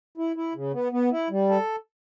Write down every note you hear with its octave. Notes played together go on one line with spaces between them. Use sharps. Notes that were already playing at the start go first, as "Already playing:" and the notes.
E4
E4
C#3
B3
B3
E4
G3
A4